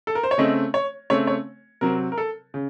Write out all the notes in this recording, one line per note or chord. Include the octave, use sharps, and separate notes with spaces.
A4
A#4
C5
C#5
C#3 A3 C4 D#5
C#5
C#3 A3 C4 C#5
C#5
C3 F#3 C4 A#4
A#4
A4
C#3